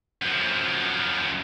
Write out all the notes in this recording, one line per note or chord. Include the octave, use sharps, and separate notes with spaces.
F#2 F3